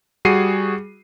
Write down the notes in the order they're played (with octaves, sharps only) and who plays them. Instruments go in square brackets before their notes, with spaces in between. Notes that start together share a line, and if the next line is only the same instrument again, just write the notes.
[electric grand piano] G3 F#4 G#4 C7 D#7